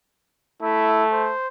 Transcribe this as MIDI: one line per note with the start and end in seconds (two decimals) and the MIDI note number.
0.62 1.32 57
0.62 1.04 64
1.13 1.48 72